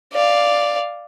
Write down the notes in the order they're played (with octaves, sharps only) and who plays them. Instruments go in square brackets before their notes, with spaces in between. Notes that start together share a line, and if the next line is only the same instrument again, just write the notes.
[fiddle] D5 F5